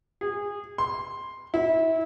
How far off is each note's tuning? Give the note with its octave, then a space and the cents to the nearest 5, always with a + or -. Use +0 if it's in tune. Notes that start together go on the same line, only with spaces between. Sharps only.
G#4 -25
C6 +5
E4 -25